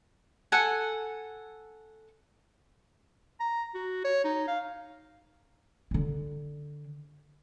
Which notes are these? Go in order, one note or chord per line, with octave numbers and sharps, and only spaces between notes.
A4 F#5 G#5
A#5
F#4
C#5
D#4
F5
D3 D4